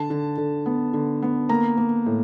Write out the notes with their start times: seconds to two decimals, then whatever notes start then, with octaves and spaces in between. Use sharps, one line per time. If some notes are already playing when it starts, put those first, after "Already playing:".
Already playing: D3 A5
0.10 D3
0.38 D3
0.66 B3
0.94 D3
1.22 B3
1.49 A#3 A#5
1.77 A#3
2.06 A2